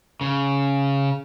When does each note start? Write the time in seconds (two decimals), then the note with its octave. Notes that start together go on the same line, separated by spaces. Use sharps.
0.21 C#3